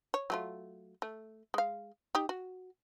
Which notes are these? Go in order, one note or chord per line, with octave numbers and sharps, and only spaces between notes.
C#5
F#3 A3 F4
A3
G#3 F5
D#4 G4
F#4